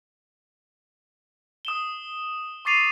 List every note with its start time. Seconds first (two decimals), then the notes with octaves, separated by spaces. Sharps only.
1.65 D#6 E7 G7
2.65 C#6 D6 A6 C7 D#7 F7